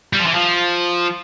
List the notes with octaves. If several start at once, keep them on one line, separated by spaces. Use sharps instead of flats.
G3
F3
E3
F3